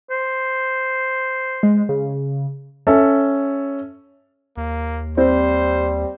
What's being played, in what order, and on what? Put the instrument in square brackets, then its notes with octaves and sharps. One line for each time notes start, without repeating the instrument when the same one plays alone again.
[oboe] C5
[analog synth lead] G#3
C#3
[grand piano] C#4 A4 E5
[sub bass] D#2 [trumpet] A#3
[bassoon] G3 [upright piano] C4 [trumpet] C5